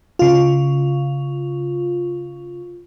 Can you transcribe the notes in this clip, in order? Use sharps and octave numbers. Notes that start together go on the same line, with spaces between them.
C#3 F4